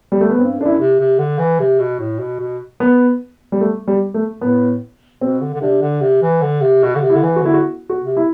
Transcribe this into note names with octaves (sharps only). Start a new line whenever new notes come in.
G3
A3
B3
G2 C4
F#2 D4
E4
C3
C3
D3
E3
C3
B2
A2
B2
B2
B3
G3
A3
G3
A3
A2 B3
B2 C4
D3
D3
C3 D4
D3
C3
E3
D3
C3
B2 F#4
D3
C3
E4
D3
E3
F#4
D3 E4
F#4
F#4
C3
E4